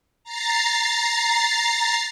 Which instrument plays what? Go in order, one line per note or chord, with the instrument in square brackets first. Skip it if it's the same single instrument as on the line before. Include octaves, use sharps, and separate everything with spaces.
[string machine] A#5 A6 C7